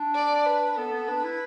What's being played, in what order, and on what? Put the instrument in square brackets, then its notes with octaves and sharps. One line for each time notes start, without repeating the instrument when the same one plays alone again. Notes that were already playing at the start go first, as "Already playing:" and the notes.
Already playing: [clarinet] D4
[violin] D5
B4
[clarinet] B3 [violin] A4
[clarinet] B3
[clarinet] D4 [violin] B4
[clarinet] E4